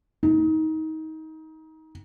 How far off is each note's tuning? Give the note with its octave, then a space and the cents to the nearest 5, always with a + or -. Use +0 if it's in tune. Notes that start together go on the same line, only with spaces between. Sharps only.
D#4 +25